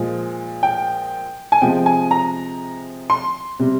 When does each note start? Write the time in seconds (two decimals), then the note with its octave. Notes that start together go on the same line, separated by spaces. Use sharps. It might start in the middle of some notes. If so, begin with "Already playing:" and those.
Already playing: A#2 F3 G#3
0.63 G5
1.52 G#5
1.61 C3 F3 G#3 G5
1.86 G#5
2.11 A#5
3.10 C6
3.59 C3 G3